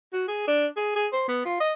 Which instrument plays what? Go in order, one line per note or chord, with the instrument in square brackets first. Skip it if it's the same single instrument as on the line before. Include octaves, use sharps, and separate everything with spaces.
[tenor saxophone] F#4
G#4
D4
G#4
G#4
C5
B3
F4
D#5